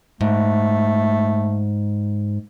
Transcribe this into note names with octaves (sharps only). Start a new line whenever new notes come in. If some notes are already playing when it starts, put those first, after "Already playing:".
G#2 A3